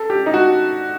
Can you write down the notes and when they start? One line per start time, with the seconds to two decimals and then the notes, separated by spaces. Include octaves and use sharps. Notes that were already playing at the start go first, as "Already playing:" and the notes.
Already playing: A4
0.10 G4
0.26 D#4
0.34 F#4